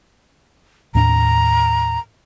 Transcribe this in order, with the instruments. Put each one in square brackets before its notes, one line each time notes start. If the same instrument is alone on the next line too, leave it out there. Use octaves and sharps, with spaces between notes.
[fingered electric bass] D#2 A2 D4 [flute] A#5